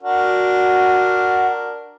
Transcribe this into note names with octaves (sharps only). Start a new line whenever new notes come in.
D4 F#4 A#4